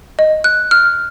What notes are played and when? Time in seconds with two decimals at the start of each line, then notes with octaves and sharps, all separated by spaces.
0.19 D#5
0.44 F#6
0.71 F6